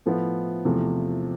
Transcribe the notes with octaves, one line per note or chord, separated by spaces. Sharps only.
A2 F3 B3 E4
E2 C3 F3 A3